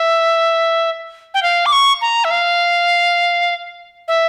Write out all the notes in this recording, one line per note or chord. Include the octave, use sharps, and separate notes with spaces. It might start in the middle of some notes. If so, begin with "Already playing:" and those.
Already playing: E5
G5
F5
D6
C#6
A#5
E5
F5
E5